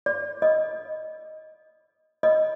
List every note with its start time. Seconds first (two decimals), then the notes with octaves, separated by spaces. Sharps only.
0.06 D5
0.42 D#5
2.23 D#5